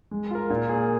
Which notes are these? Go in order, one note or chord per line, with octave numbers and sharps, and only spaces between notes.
G#3
F4 A#4
A#2
A#3 G#4